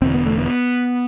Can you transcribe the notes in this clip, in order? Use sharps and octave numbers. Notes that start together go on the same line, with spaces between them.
E1 E2 D3 C4
B3
A3
B3